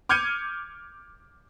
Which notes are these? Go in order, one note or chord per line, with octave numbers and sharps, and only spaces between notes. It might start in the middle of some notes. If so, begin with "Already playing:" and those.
D6 F6 G6 G#6 C#7 D#7